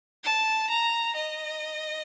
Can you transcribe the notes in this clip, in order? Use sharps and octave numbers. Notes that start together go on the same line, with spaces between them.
A5
A#5
D#5